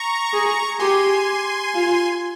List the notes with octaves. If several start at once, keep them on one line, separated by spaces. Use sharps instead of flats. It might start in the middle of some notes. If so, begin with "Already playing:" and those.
Already playing: A#5 C#6
G#4
G4 G#5 C6
F4